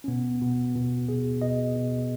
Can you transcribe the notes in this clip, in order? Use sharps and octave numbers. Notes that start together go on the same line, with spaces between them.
C#4
B2 B3
B2 B3
B2
B2 G#4
B2 D#5
B2